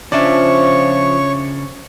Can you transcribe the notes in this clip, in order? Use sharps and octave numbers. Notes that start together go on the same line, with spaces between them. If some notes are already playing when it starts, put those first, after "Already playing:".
C#3 F3 C#4 D4 C#5 D5 E5 C#6